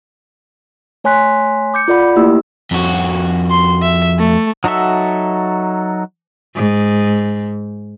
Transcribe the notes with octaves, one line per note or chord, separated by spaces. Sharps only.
A3 C#5 G#5 C6 F#6 B6
D6 G6 C#7
F4 A4 D5 F#5 B5
A3 A#3 E4 G4 E6
F2 F#4
C6
E5
A3
F#3 D#4 F#4 A4 E5
G#2